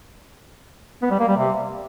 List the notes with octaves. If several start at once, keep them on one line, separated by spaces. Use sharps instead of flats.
B3
G3
A#3
G3
C3